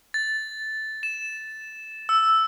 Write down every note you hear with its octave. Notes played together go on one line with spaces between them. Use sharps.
A6
E7
E6